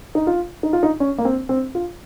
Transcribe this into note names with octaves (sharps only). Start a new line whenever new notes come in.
D#4
F4
D#4
F4
D#4
C#4
A#3
C4
C4
F4